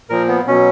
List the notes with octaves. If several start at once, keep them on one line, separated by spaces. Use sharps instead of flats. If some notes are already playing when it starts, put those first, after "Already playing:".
A#2 F3 A#4
B3
B2 F#3 C#4